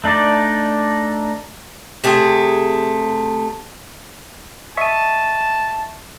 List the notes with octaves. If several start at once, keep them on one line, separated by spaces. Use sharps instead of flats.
A3 D4 D#4 D5
C3 A3 G#4
D#5 E5 A5 C#6 B6 D#7